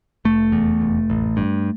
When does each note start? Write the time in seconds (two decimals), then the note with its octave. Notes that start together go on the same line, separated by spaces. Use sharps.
0.25 F1 A3
0.52 E2
0.81 F1
1.10 A1
1.37 G2